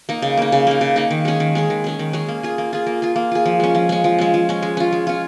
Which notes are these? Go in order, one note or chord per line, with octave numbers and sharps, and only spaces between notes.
A#3 D#4
C#3
A#3 D#4
C#3
A#3 D#4
C#3
A#3 D#4
D#3
G#3 C#4 G#4
D#3
G#3 C#4 G#4
D#3
G#3 C#4 G#4
D#3
G#3 C#4 G#4
A#3
F4 G#4
A#3
F4 G#4
A#3
F4 G#4
A#3
F4 G#4
F3
G#3 C#4
F3
G#3 C#4
F3
G#3 C#4
F3
G#3 C#4
G#3
C#4 F4
G#3
C#4 F4